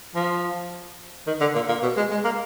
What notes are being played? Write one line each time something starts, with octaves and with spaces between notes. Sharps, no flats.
F3
D#3
D3
A#2
A#2
B2
G#3
G#3
A#3